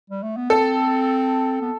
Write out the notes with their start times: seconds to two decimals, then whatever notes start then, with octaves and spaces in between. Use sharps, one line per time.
0.10 G3
0.23 A3
0.37 B3
0.50 C4 A4
1.62 B3